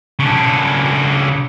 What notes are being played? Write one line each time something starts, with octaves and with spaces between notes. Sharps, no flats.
C#3 D4